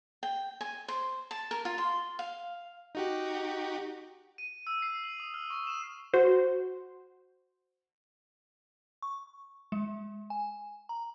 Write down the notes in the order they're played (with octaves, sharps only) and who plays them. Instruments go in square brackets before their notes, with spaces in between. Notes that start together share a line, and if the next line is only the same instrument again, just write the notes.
[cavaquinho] G5
G#5
C5
A5
A#4
F4
C6
F5
[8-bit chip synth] D#4 F#4 G4
[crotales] D#7
E6
C7
F#7
D#6
F6
C#6
E7
[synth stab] F#4 C5
[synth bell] C#6
G#3
G#5
A#5